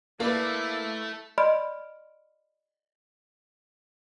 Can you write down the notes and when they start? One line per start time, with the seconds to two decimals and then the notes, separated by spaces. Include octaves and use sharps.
0.20 A3 A#3 E4 B4 D5
1.38 D5 D#5 B5 C6 F6 D7